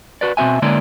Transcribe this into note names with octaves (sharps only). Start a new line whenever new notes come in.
F#4 B4 D5
B2 C4 F#4 E5 G#5
D3 G#3 A#3 C#4 E4 D5